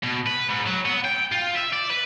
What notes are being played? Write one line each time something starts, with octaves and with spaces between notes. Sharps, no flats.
B2
B4
G#2
F#3
B3
G5
F4
E5
D5
B4